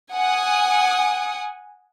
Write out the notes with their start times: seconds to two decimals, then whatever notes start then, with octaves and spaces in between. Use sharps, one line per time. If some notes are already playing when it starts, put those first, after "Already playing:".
0.13 F#5 G#5 D#6